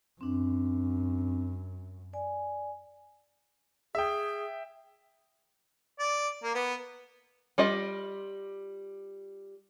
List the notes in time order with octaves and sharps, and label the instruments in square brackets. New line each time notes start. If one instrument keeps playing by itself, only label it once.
[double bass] F#2 [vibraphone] C4 D4
[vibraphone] D5 G#5
[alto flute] G#4 [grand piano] E5 G5
[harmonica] D5
A#3
B3
[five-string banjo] G3 F4 D#5